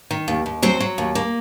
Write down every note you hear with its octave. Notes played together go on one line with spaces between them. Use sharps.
D#3
D#2
D#2
F#3 C4 C5
F#3
D#2
A#3